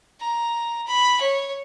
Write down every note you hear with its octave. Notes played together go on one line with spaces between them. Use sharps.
A#5
B5
C#5